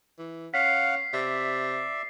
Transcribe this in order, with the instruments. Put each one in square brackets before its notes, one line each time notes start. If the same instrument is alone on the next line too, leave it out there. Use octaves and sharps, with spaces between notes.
[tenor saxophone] E3
[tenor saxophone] C#4 [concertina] F5 F#5 [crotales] B6 C7
[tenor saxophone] C3 [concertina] D5 E5